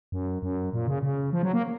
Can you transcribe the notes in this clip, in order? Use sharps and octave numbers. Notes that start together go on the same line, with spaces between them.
F#2
F#2
A#2
C#3
C#3
F3
F#3
A#3